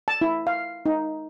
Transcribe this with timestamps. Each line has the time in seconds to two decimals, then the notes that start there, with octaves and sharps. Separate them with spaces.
0.08 A5
0.21 E4
0.47 F5
0.86 D#4